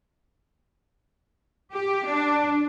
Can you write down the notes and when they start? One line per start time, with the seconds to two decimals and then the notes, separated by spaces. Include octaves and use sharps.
1.73 G4
2.05 D4